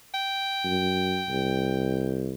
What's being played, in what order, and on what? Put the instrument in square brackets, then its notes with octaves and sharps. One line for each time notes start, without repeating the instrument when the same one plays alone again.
[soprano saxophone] G5
[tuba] F#2
C2